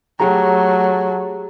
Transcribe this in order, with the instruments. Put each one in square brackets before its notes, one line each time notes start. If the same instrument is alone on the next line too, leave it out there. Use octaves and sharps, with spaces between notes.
[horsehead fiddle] F#3 A3 [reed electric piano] G4 G#4 A#5